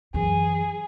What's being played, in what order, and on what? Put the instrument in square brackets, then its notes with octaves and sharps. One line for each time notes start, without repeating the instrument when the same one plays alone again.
[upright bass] F#2 E3 [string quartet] G#4